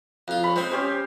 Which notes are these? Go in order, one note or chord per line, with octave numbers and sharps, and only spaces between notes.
F2 F4
C#5 B5
G#3 C4 C5
C#4 G4 C5